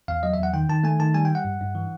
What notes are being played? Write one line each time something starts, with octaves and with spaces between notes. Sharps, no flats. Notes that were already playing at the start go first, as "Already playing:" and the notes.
E2 F5
F#3 D#5
E2 E5
F#5
D#3 G5
D#3 A5
A3 G#5
D#3 A5
G3 G#5
G3 G5
F#5
G2
G2
E3